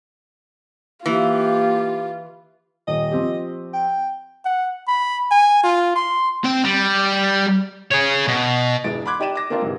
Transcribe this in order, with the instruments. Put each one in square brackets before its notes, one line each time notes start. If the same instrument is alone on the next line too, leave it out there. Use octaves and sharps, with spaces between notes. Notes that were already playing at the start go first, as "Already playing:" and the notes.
[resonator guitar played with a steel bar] E3 [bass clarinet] A#3 [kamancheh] F4 [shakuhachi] G4
[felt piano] D#1 [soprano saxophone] D#5
[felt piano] F3 C4 G4
[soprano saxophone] G5
[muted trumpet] F#5
B5
G#5
F4
C6
[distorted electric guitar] C4 G5
G3
G#4 C#5
B2
[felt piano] E1 E3 G#3 A6 D7
B5 C6 D6 F#6 G#6
D#4 G4 D5 D#7 E7
D6 A#6
A#3 C4 D4 F4 A#4 D5
G#2 C3 E3